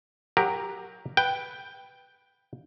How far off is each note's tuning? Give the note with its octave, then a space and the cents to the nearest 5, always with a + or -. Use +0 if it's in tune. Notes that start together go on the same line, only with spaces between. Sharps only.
F#3 +0 G4 +20 A#4 +0
B4 +0 G5 +0